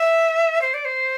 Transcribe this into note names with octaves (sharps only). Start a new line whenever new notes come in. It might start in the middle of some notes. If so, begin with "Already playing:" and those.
Already playing: E5
C5
D5
C5